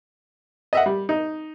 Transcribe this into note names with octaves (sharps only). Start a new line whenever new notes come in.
D#5 E5 F#5
G3
D#4